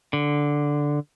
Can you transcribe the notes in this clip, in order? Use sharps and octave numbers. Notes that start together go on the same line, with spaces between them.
D3